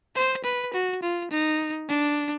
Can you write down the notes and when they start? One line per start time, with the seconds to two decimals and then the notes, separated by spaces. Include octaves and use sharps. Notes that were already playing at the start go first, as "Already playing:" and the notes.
0.16 C5
0.44 B4
0.73 F#4
1.02 F4
1.31 D#4
1.89 D4